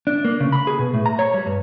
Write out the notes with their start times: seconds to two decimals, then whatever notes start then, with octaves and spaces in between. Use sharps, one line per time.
0.07 D4
0.25 A#3
0.40 C#3
0.52 B5
0.67 G#4
0.79 B2
0.94 A2
1.06 A#5
1.19 C#5
1.34 G3
1.46 G2